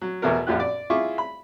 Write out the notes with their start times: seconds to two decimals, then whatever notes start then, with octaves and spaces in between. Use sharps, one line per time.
0.02 F#3
0.22 A1 E2 B2 A3 F#4 A#4
0.47 A#1 F#2 A#2 F4 G4 F#6
0.60 D5
0.90 E4 F4 G#4 E5 C#6 D6
1.18 B5